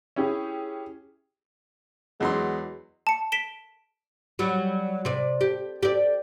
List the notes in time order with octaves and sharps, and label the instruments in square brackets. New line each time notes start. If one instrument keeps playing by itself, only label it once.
[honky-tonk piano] C#4 E4 G4 G#4
[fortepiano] E2 F#3 C6 [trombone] G#3
[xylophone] A5 C#7
B6 D7 E7 G7
[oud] F#3 G3
C3 D5
G4
G4 D5